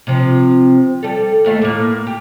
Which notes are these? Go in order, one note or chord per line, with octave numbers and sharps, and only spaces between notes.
C3 F3
G3 A4
D#2 A3 F5
A2 A#3
G4